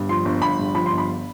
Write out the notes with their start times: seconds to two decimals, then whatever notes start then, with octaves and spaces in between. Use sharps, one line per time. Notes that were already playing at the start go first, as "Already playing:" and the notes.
Already playing: G1 G2
0.09 F3 C6
0.25 G1
0.42 G1 B5
0.59 G2
0.75 F3 B5
0.86 C6
0.92 G1
0.98 B5